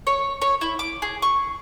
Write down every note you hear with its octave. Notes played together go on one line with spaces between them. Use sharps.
C#5
C#5
E4
D6
G#4
C#6